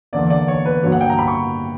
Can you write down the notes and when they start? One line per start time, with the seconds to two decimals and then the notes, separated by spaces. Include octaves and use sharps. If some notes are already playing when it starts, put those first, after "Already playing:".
0.13 E2 D3 A#3 D5
0.30 D5
0.48 C#5
0.65 B4
0.83 G2 D3 F#3 A#3 C#5
0.92 F#5
1.01 G5
1.10 A#5
1.19 B5
1.28 C#6